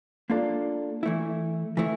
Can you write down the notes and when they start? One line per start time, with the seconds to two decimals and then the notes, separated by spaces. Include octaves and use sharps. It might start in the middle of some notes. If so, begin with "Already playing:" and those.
0.30 A#3 D4 F4 A4 D5
1.03 E3 A3 E4
1.77 E3 A3 E4